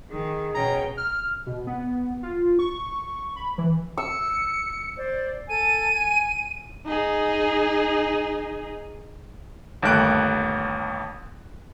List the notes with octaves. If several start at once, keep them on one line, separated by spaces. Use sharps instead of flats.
D#3 G#4
B2 C#4 G5 A#5
F6
B2
B3
F4
C#6
B5
E3
E6 C#7
C5 D5
A4 G#5 A5 D#7
G#5
D#4 G#4
G1 D#2 A3 F#6 D7